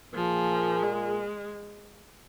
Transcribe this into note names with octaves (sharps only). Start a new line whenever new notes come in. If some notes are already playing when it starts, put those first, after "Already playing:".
A#2 F3 A#3 F4 G#4
G#3